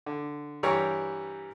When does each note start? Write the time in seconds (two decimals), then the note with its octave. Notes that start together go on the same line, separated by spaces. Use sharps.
0.06 D3
0.63 G2 E3 G3 G4 A#4 C#5